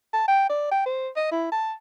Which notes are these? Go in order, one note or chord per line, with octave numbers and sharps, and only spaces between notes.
A5
G5
D5
G5
C5
D#5
E4
A5